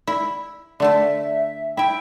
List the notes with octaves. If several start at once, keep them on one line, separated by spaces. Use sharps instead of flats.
E4
D3 A3 E5 A5
E4 E5 G5